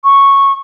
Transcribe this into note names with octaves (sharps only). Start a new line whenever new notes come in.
C#6